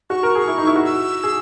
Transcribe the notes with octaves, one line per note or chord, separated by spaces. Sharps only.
F#4 C#6
A#4
G#4
E4
D#4
E4
F#4
E6
G#4